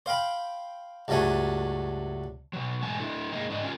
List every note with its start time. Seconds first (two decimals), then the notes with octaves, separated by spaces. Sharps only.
0.06 C5 F5 G5 B5
1.08 C#2 G2 F#3 A3 G#5
2.53 B2 F#3
2.83 G#2 B2 G#3 A3 G#5 A5
2.99 A3 D4 E4 A4
3.32 G#3 A#3 D#4
3.50 G#2 D3 D4 D#5
3.63 C#4 F4 F#4 A#4